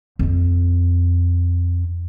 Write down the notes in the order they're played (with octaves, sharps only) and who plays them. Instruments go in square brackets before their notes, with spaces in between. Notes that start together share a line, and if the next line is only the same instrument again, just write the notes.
[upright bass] F2 C4